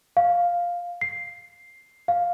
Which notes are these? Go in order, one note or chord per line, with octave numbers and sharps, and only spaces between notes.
F5
C7
F5